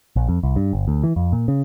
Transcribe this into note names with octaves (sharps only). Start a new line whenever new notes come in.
A#1
F2
C2
G2
G1
D2
E3
F2
A#2
C#3